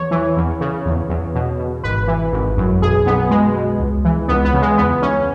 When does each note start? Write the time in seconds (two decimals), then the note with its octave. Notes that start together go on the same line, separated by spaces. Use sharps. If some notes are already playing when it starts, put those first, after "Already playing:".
Already playing: E2 C#5
0.11 E3
0.37 E2
0.61 C#3
0.86 E2
1.09 E2
1.35 B2
1.59 B2
1.84 G#1 B4
2.07 E3
2.33 G#1
2.57 F#2
2.82 B1 G#4
3.06 B1 B3
3.30 B2 G#3
3.55 B2
3.79 C#2
4.05 E3
4.28 C#2 B3
4.45 B3
4.54 C#3
4.62 G#3
4.78 E2 B3
5.02 E2 C#4